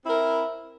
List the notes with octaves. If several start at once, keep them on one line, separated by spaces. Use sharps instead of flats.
C4 E4 A#4